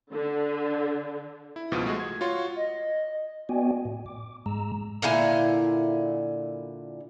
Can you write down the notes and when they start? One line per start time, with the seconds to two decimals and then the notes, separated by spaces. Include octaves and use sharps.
0.13 D3
1.56 E4
1.72 C#2 G#2 B2 F3
1.86 G#3 A3 F#4 G#4
2.00 G#6
2.21 F4 F#4 C#5 C6
2.56 D#5
3.49 B3 F#4 D5 D#5 G5 G#5
3.85 A2
4.06 D6
4.46 G#2 G#3 A#5 E6
5.02 A#2 D3 E4 G#5